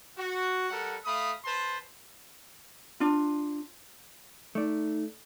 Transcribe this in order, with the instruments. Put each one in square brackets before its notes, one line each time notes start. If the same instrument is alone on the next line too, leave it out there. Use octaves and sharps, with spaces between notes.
[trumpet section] F#4
G3 A4 A#4 F#5
A3 F5 B5 D#6
B4 C5 A5 C6
[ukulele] D4 F4
[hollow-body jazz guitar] A3 D5 [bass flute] D#4